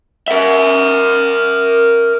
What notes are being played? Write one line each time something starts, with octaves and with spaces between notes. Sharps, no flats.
A#4 E5